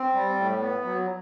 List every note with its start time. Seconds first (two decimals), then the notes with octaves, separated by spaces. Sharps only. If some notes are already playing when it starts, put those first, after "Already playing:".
Already playing: C4
0.14 G3
0.37 A2
0.60 B3
0.84 F#3